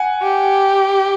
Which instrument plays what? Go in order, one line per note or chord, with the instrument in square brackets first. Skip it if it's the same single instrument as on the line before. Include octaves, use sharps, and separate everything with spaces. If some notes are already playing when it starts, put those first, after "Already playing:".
Already playing: [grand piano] F#5 G#5
[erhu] G4